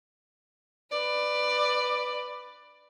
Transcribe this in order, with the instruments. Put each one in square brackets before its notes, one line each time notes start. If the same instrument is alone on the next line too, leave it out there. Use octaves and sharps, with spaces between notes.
[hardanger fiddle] B4 D5